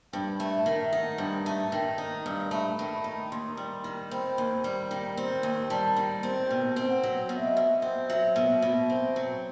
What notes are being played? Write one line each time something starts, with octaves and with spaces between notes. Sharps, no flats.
G2 G5
A3
E5
D#3
E5
D#4 F#5
G2
A3
D#3 G5
D#4
G2
A3 B5
D#3
B5
D#4
D#2 C6
G3
D#3
C4 B5
D#2
G3
D#3
C4
D#2
G3 A5
D#3
C4
B2 G5
C4
F#5
F#3
B2 F#5
E5
D#5
E5
B2
C4
F#3 E5
B2
B2
C4
F#3